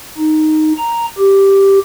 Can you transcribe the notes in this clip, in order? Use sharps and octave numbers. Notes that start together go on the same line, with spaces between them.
D#4
A#5
G4